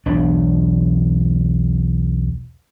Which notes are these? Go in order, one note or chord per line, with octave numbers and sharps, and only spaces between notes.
B1 E2 D4